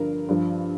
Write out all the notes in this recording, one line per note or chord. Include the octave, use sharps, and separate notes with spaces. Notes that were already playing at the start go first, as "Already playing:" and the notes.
Already playing: G2 D3 F3 A#4
G2 F3